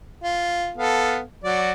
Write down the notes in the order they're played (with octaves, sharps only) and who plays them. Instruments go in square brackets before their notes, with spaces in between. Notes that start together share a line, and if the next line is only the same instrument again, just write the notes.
[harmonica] F4
B3 A4 F5
F#3 F#4 D5